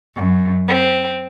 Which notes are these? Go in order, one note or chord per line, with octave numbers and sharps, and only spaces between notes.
F#2
C4